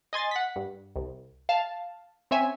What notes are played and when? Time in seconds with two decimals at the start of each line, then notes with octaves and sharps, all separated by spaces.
0.13 D#5 G#5 C6 A6
0.31 F#5 B6
0.56 G2
0.96 C2
1.49 F5 A5
2.31 C4 C#4 C#5 E5 G#5